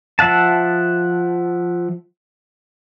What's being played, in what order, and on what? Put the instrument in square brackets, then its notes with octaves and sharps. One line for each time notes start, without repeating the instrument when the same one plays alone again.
[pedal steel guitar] F3 E5 F#5 A5